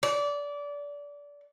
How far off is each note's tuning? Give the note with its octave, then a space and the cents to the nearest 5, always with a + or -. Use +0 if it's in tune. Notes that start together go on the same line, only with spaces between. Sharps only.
D5 -25